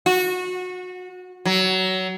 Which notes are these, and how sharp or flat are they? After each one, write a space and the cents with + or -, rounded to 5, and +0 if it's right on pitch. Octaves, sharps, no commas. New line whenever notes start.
F#4 -25
F#3 +20